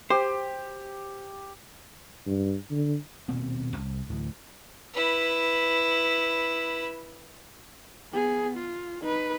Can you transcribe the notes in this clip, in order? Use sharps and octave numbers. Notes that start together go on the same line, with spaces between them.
G4 C5
G2
D3
D#1 B2 A#3 C4
C2
D2 A2 D3 E3
E4 B4
B3 G#4
F4
D#4 B4